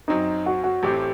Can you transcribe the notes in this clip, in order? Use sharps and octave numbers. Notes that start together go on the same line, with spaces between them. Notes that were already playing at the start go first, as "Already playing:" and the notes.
F#2 F#3 C4 D#4
F#4
F#4
A1 A2 A3 C4 G4